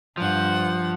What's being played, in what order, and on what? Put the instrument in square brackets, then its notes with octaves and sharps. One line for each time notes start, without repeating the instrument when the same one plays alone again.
[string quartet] G2 F#5 [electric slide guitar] F3